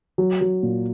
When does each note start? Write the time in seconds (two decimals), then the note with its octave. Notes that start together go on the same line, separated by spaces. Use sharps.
0.18 F#3
0.41 F#3
0.63 A#2